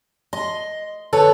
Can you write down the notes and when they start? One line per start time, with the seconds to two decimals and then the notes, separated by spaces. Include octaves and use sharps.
0.33 D#5 C6
1.13 D3 A4 B4 C#5